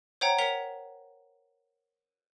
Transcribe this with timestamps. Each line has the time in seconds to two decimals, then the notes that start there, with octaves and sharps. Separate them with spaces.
0.21 C5 C#5 F#5 G5 A#5
0.38 A#4 C#5 F#5 B6 F7